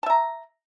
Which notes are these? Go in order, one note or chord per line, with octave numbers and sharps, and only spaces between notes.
E5 A5 A#5